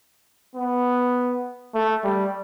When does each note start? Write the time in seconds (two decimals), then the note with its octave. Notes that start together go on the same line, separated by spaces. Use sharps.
0.55 B3
1.74 A3
2.04 G3